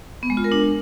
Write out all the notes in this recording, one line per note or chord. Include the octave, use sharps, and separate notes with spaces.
B3
G#3
F4
A#4
D4